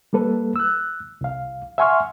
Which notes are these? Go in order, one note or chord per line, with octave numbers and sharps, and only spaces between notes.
G3 A#3 A4 B4
E6 F#6
C2 F5
E5 F#5 G#5 C6 C#6 F6